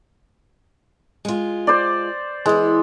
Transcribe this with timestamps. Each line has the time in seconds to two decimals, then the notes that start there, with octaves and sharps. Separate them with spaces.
1.25 G#3 F4
1.67 C5 D5
2.46 E3 G#3 B3